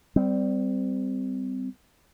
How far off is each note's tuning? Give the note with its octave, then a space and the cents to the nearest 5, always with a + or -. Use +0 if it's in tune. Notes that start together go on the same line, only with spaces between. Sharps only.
G3 +0 C4 -25